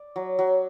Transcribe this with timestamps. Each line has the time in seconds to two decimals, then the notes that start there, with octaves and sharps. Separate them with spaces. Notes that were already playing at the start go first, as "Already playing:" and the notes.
Already playing: D5
0.16 F#3
0.39 F#3